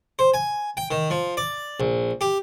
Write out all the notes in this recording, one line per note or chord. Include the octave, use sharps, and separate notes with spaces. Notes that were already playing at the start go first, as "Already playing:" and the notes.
C5
G#5
G5
D#3
F3
D5
A#1
G4